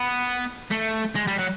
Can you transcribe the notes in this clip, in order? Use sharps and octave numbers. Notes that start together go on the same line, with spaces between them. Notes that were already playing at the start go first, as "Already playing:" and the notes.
Already playing: B3
A3
G#3
G3
F#3